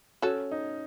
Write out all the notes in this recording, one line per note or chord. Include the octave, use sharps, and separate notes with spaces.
C#4 F#4 A4
D#4